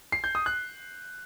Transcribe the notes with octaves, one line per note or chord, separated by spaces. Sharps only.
C7
G6
D#6
F#6